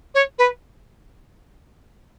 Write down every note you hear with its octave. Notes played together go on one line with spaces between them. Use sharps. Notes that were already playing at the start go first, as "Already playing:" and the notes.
C#5
B4